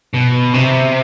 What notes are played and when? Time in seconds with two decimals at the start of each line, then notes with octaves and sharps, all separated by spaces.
0.14 B2
0.54 C3